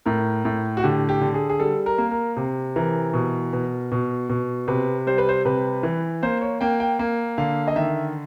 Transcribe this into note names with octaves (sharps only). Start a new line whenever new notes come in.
A2 A#4
A2
F#4
D3 G4
G4
D3
G#4
G#4
G3 A4
A#4
A#3
A#4
C3
E3 A#4
B2
B2
B2
B2
C3 B4
G3 C5
B4
C5
C3 B4
E3
A#3 C5
C#5
A#3 G5
G5
A#3
D3 F5
D#5
D#3 E5